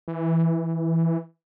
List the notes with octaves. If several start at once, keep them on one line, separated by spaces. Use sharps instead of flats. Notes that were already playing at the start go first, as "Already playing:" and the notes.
E3